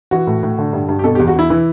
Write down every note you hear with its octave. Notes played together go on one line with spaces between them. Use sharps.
E3 F#4
A2
A2
D3
G2
G2
G4
B2 A4
E2 G4
F#4
E2 E4
E3 E4